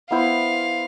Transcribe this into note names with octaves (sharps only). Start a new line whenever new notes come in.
B3 E4 C5 F5